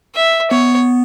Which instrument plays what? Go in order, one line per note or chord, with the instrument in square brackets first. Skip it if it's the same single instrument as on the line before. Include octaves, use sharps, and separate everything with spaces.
[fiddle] E5
[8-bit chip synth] B3 [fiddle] C#5